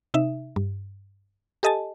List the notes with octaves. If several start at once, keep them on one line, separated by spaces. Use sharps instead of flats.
C3 D#4 E5
G2
G4 A4 D#5 G#5 A5